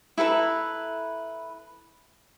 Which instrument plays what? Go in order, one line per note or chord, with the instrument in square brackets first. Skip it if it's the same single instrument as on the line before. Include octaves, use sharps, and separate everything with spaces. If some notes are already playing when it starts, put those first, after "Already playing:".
[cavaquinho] E4 A4 B4 A#5